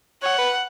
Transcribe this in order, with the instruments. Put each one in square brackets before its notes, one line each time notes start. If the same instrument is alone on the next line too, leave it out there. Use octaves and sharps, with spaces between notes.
[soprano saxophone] C#5 [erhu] F#5
[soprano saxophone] B4